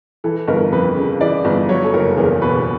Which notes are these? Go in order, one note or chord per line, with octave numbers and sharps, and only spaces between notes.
E3 A4
G1 A#4
F2 B4
C#3
E3 D5
G1
F#3 C#5
A4
F#1 A#4
E2 A#4
B2 B4